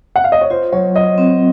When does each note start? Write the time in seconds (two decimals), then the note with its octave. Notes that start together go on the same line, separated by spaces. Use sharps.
0.16 F#5
0.24 F5
0.32 D#5
0.41 C#5
0.50 F4 C5
0.73 F#3 C#5
0.95 F#3 D#5
1.18 C4